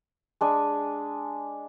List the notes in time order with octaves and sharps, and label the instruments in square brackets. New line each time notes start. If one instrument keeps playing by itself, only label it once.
[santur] G#3 D4 G#5